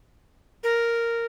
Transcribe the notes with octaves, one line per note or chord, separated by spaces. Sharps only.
A#4